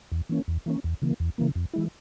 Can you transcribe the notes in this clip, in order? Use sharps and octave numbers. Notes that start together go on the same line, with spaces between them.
E2
E3 A#3 C#4
E2
E3 A#3 C#4
E2
C#3 E3 A#3
E2
C#3 E3 A#3
F2
E3 G#3 E4